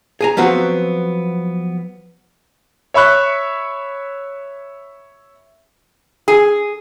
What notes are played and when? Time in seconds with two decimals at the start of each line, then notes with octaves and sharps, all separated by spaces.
0.21 G#4 G#5 A#5
0.37 F3 F#3 B3 C4 F#4
2.94 C#5 E5 B5 C#6 F#6
6.28 G#4